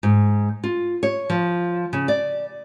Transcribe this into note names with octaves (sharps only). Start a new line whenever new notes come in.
G#2
F4
C#5
F3
C#3
D5